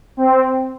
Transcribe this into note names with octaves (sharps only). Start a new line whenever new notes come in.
C4